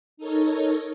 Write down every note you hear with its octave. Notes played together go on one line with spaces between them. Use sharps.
D#4 A4 A#4 C#5